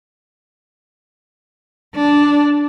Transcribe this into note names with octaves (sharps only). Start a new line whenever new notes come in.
D4